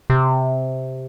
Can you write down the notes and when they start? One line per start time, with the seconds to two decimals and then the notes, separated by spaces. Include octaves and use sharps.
0.10 C3